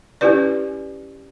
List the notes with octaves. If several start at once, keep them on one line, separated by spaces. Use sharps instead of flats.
C#4 E4 G4 B4 D5